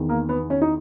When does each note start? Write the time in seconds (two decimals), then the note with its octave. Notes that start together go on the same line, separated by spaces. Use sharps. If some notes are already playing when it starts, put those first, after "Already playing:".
Already playing: E2 D#3
0.09 A#3
0.29 B3
0.50 C#4
0.62 D#4